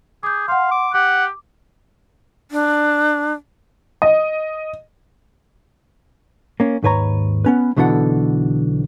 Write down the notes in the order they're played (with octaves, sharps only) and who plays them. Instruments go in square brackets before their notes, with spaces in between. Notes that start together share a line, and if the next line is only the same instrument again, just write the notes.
[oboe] G#4 [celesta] D6 G6
[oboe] F5 [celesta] F#5 C6
[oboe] D6
[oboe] G4 [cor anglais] F#5 [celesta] D6
[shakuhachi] D4
[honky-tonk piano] D#5
[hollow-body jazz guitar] A#3 C#4
D#2 G#2 B4 C#5 A#5
B3 C#4 B4
B1 B2 D3 E3 A4 F#5